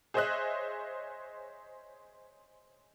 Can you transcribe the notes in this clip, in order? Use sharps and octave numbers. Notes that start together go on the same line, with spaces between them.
G#4 C5 C#5 D#5 E5 F#6